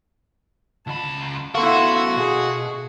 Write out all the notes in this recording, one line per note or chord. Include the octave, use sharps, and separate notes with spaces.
C#2 A5 B5
B3 E4 F#4 A4 A#4 F5 C6
B2 G#4